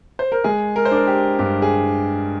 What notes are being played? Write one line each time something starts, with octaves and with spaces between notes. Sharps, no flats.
C5
A#4
G#3 G#4
A#4
C5
D4 A#4
G4
G2 G4
G#4